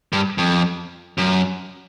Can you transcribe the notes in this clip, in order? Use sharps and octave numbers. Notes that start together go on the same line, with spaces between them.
G2
F2
F#2